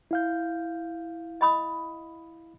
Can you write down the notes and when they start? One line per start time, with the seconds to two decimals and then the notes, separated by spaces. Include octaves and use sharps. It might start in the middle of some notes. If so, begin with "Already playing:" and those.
0.11 E4 F5 G6
1.41 D#5 B5 D#6